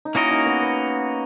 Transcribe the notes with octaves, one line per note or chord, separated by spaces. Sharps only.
D#4
A#3 C#4 E4 F#4 A#4 D#5
D#4
B3
B3